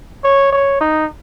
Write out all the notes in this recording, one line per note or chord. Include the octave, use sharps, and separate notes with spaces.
C#5
C#5
D#4